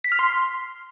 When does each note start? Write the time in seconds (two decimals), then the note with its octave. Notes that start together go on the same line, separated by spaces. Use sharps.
0.04 B6
0.12 F6
0.19 C6